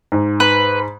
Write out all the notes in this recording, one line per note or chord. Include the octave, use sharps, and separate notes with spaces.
G#2
B4